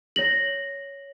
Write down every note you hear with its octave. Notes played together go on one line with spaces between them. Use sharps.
C#5 A#6 F#7